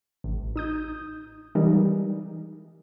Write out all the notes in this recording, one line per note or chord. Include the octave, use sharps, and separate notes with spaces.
A1
D#4 D#6 G6
E3 G3 G#3 D#4 A#4